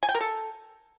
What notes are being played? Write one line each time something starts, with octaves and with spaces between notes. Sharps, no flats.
G#5
G5
A#4
A4